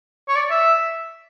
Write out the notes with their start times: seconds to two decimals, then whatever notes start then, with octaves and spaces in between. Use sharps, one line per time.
0.28 C#5
0.36 D5
0.51 E5